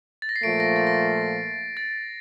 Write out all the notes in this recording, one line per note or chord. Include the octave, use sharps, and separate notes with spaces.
A6
A#6
C7
A#2 F3 A3 D7
A#6
A6
A#6
A6
A6